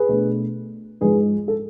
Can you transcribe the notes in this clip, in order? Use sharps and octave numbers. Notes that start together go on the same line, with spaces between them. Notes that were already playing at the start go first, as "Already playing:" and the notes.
Already playing: G#4 B4
B2 A3 D4
G#2 F3 G#3 G#4 B4
A4